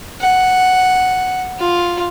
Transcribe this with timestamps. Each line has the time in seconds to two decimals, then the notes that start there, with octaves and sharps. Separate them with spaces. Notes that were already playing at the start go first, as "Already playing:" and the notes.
0.21 F#5
1.60 F4